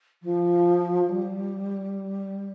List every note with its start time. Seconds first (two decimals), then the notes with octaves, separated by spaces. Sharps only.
0.22 F3
1.09 G3